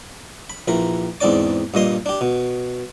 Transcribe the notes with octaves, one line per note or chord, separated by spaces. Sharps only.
B5
A#1 E3 A#4 B5
E2 G#2 C4 D4 D5 D6
G2 A#2 D#5 C6
D4 G4
B2